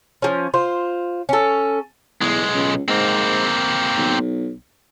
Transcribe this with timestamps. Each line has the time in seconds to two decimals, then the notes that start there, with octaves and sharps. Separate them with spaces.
0.22 F3 C#4
0.54 F4 C5
1.29 C#4 A4
2.21 B1 E2 G#3
2.53 C#2
2.88 G#2 A#3 C4
3.97 B1